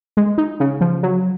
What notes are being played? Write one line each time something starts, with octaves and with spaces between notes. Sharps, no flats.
G#3
D#4
C#3
F3
F#3